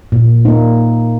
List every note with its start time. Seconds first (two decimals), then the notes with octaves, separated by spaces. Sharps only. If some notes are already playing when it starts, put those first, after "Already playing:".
0.12 A#2
0.45 A#3 D#4